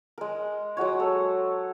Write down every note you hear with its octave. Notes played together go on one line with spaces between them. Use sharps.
G#3 A#4
F#3 G#3 F#4 C#5
A4